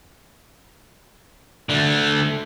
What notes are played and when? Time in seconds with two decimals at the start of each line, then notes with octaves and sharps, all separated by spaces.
1.69 D3 A3